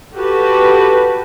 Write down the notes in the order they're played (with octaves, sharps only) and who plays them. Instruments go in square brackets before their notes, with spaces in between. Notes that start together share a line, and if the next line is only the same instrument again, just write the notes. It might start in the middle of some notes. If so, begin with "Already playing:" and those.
[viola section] F#4 G4 A4 B4